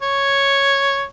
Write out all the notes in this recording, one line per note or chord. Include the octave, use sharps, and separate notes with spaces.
C#5